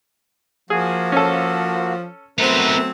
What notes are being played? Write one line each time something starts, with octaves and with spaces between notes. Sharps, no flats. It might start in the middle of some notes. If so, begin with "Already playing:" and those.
F3 A#3 F#4 G#4
C#4 A4
F#3 A3 B3 C4 D#4 A#4 B4 E5